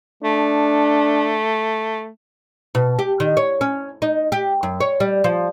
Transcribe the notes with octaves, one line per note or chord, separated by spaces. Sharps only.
A3 D4
B2
G4
D#3
C#5
C#4
D#4
G4
F#2
C#5
G3
F3